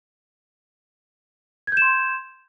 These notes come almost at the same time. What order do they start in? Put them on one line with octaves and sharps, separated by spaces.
G#6 G6 E7 C6